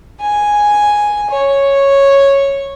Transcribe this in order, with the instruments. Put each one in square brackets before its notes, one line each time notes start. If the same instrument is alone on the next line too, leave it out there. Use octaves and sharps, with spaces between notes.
[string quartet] G#5
C#5